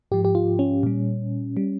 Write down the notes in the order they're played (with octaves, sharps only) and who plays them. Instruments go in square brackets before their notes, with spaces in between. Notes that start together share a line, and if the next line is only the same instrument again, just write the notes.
[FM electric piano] G#2 F3 G4
G4
F4
C#4
A#2 G3
G3